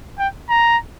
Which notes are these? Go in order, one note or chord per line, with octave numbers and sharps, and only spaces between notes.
G5
A#5